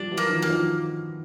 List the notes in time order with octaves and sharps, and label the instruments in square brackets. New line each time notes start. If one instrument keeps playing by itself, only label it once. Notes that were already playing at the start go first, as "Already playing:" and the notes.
Already playing: [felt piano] F3 G3 [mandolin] D4
[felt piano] E3 F#3
[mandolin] A#3
[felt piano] D#3 F3
[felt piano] F#3 [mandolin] A#3
[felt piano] D#3 F3